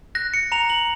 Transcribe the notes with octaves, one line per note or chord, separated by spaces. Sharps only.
F#6 A#6
C#7
A#5 F7
F#7